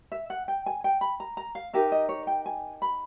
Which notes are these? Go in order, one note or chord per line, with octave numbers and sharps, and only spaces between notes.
E5
F#5
G5
G#5
G5
B5
A#5
A#5
F5
D#4 G4 A#4 E5
D#5
C#5
G5
G#5
B5